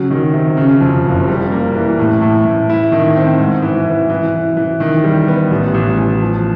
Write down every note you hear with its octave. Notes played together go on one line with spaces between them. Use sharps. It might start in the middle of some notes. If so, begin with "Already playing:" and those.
Already playing: C#3 F#3
D#3
C3
C#3
F2
F#1
G3
A#3
E3
A2
A2
A2
E4
D#3
C4
G#2
E3
E3
E3
E3
E3
D#3
G3
B3
A1
A1
A1
F3